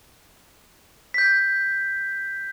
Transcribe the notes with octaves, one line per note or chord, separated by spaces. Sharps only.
G6 B6